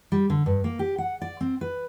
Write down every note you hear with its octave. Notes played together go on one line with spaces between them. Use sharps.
G3
D3
G2
A#3
G4
F#5
D5
C4
B4